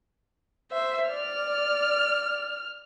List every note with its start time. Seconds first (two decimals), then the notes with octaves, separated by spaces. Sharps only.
0.71 C5 E5
1.10 D5 F6